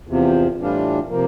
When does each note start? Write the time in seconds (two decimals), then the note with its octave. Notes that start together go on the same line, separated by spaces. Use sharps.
0.07 E2 C3 F3
0.58 A2 E3 G3 D4 F4
1.09 C3 F3 A#3